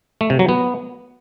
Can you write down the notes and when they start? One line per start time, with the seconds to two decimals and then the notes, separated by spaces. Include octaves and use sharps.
0.21 A3
0.30 C3
0.39 F#3
0.49 B3